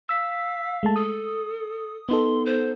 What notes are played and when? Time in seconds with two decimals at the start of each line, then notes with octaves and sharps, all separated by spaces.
0.09 F5 E6 B6
0.83 G#3 A3 A5
0.96 A4 D#6
2.09 B3 D#4 A4 C6
2.46 C5